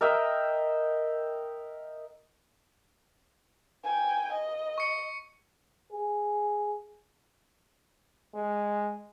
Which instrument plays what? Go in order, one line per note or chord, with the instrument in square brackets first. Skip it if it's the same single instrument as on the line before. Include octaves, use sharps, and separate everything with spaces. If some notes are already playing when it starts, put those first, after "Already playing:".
[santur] A#4 D#5 E5 G5
[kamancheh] G5 G#5
D#5
[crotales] C#6 C#7
[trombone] G#4
[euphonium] G#3